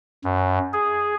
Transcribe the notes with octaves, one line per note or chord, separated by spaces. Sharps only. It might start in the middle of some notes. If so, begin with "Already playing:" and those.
F#2
G#4